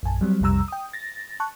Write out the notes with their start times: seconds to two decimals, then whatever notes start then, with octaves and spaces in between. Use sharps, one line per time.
0.03 A#1 F#2 G#5 A5
0.21 F#3 G3 C4
0.41 B1 F2 C3 G3 A#5 E6
0.68 G5 D#6
0.93 A6 A#6
1.40 A5 C#6 F#6